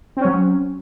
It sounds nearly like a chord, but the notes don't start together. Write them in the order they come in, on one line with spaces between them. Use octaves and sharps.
C4 C#4 F#3